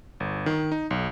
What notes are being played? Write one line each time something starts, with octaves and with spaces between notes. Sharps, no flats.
G1
D#3
D#4
B1